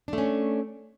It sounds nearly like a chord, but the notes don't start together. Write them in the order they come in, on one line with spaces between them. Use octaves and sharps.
D4 A3 C#4